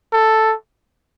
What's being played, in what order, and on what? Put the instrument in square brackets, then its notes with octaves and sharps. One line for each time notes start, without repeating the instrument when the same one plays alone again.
[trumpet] A4